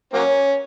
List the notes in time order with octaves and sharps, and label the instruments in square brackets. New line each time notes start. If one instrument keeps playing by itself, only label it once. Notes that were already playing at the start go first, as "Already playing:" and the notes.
[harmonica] F#3 A#3 C#4